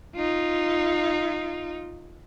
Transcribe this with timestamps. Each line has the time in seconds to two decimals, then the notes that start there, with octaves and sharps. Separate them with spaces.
0.15 D#4 F4